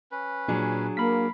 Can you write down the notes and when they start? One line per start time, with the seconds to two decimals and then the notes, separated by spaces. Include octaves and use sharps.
0.12 C#4 B4
0.48 A#2 F#3 D4 G#4
0.97 A#3 A#4 F5 B5 B6